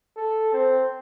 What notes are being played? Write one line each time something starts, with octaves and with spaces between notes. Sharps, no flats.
A4
C4